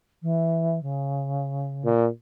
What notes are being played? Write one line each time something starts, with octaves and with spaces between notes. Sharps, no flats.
E3
C#3
A#2